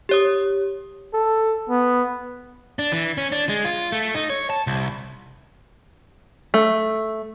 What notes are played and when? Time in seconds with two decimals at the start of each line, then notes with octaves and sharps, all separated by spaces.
0.09 G4 C#5 D#6
1.14 A4
1.70 B3
2.79 D4
2.92 E3
3.18 C#4
3.32 D4
3.49 G#3
3.65 F4
3.92 A3
4.15 D#4
4.30 C#5
4.50 A5
4.67 C2
6.54 A3